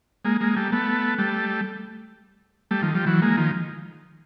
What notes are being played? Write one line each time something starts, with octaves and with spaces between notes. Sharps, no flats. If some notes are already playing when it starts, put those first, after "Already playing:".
G#3 A#3
G#3 A#3
G3 A3
A3 B3
G3 A3
G3 A3
D#3 F3
F3 G3
E3 F#3
G#3 A#3
D#3 F3